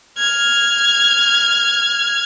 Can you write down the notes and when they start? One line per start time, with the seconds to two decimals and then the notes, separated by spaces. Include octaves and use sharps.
0.18 F6 G#6